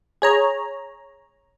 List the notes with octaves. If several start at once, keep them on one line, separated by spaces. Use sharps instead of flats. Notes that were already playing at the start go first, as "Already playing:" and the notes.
G#4 C#5 A#5